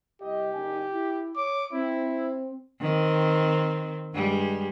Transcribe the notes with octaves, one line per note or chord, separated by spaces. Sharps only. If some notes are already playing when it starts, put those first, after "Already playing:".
C2 G4 D#5
F#1 D#4 G#5
E4
C#5 D6
C4 E4
D#3 C4
G2 G3 G#3